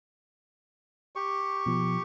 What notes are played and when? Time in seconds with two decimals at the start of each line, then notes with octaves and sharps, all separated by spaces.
1.16 G4 C#6
1.66 B2 F3